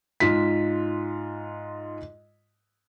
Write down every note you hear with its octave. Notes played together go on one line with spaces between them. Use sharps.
G#2 F4 B6